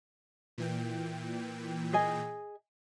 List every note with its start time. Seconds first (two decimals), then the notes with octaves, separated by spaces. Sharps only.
0.58 A#2 E3 G5
1.93 G#4 D#5 G#5